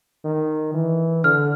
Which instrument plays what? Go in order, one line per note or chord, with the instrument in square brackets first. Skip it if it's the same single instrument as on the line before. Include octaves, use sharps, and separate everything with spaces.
[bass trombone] D#3
E3
[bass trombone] D3 [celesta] F6